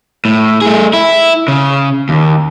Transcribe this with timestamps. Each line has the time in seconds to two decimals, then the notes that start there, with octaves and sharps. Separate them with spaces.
0.25 A2
0.62 A3 G#4
0.94 E4
1.48 C#3
2.09 D#2